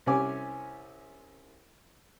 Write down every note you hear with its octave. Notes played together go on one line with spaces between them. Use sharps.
C2 C3 C#4 G#5 D6